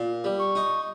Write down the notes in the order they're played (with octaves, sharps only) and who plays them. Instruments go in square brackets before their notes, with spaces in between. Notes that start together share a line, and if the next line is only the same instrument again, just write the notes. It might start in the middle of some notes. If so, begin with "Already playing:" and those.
Already playing: [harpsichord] A#2
G3
[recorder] C#6
[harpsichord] D#4